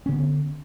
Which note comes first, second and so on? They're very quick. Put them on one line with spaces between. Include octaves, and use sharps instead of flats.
C#4 D3 B3